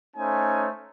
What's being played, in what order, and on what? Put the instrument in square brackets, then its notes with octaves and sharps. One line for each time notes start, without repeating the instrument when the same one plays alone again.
[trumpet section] A3 C#4 D#4 C5 G#5